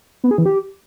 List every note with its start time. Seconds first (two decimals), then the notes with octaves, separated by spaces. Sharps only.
0.24 B3
0.31 G#4
0.38 E3
0.46 G4